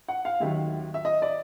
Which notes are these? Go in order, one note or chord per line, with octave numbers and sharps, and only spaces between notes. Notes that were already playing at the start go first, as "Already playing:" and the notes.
F#5
F5
D#2 D#3 F#3 E5
E5
D#5
D5